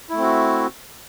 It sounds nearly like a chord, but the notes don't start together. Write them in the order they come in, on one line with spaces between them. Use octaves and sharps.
E4 A3 C4 F#4